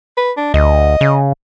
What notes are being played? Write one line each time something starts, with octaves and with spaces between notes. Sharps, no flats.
B4
D4
D2 D#5
C#3